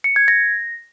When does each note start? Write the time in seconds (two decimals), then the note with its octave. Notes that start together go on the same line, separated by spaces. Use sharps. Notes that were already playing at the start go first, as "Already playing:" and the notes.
0.04 C#7
0.16 G#6
0.28 A#6